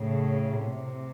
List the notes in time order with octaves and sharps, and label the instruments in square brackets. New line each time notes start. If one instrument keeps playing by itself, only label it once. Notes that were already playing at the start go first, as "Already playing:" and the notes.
Already playing: [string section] A2 C#3
C3